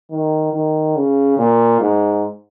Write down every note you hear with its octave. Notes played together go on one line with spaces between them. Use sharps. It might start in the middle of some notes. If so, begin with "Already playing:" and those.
D#3
D#3
C#3
A#2
G#2